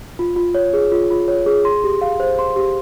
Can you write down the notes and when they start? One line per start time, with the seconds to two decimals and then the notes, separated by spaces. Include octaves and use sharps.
0.19 F4
0.36 F4
0.55 C#5
0.73 G#4
0.92 F4
1.10 F4
1.28 C#5
1.46 G#4
1.65 C6
1.84 G4
2.02 F5
2.20 C5
2.39 C6
2.56 G4